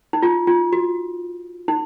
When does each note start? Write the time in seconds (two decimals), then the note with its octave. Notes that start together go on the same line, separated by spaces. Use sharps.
0.13 D#4
0.23 F4
0.47 F4
0.73 F#4
1.68 D#4